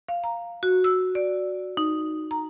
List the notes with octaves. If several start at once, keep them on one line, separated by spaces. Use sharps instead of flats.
F5
A#5
F#4
E6
D5
D#4
A#5